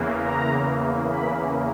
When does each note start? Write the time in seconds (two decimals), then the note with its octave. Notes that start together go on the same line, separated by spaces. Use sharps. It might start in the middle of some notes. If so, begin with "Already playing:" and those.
Already playing: E2 C#3 E3 A#3
0.21 A#5
1.10 B5